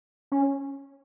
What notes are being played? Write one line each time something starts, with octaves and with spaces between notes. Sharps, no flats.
C#4